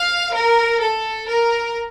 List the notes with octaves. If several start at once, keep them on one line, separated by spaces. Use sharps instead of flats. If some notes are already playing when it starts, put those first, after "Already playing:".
Already playing: F5
A#4
A4
A#4